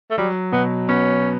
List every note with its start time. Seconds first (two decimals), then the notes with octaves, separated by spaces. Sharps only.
0.11 A3
0.18 F#3 G3
0.52 B2 B3
0.89 B3 C#4